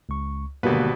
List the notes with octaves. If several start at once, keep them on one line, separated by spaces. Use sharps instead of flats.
C#2 C#6
G#1 B2 D3 G3 A#3 B4